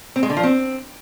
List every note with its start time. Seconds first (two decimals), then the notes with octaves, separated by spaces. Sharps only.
0.16 C4
0.23 G#3
0.30 D3
0.37 F3
0.44 C4